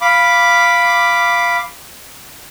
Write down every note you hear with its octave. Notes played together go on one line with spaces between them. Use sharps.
F5 B5 D6